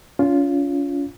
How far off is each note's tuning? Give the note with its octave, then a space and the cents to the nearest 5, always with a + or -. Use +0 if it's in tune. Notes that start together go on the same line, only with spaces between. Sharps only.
C#4 +35 F4 +0